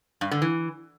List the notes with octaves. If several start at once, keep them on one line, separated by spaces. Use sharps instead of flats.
G2
D3
E3